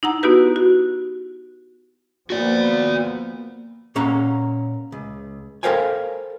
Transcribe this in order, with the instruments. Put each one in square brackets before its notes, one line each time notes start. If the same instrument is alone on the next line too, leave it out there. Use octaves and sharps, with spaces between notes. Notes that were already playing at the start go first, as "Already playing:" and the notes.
[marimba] D#4 E4 F#5 A#5
B3 D#4 E4 F#4 G4 B4
F#4
[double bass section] F3 A#3 B3 [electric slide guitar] F#4 D5
[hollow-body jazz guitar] A#2 A#3 C#4 F#5 A#5
C#2
A4 A#4 C5 F5 G5 G#5